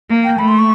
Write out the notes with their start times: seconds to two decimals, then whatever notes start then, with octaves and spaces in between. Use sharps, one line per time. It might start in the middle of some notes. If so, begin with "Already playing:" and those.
0.09 A#3
0.24 G5
0.39 A3 B5
0.48 C6
0.59 C#6